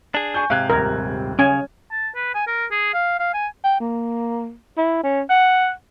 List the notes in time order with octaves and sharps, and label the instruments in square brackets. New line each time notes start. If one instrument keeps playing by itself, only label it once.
[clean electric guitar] D4 G#4
[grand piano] G#5 C#6 G6
[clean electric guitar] G#2 C3 [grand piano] F5 F#6 G#6
[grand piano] D#1 G#6 [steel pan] A#4
[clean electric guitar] C#3 [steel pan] C#4 G#5
[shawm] A5
B4
G#5
A#4
G#4
F5
F5
G#5
[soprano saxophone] G5
A#3
E4
C#4
F#5